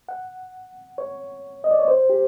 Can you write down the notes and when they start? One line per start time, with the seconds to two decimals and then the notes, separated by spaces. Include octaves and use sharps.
0.09 F#5
0.98 C#5
1.64 D#5
1.71 D5
1.79 C#5
1.88 C5
2.10 G4